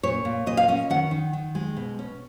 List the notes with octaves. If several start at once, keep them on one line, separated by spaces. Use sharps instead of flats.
A#2 C#5
A#2
A#2 D#5
F5
C#4 D#5
D#3 F#5
D#3
D#3
G#3
B2
C#4